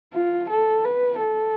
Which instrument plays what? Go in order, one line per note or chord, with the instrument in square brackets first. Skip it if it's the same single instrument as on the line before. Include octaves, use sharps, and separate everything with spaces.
[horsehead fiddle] F4
A4
B4
A4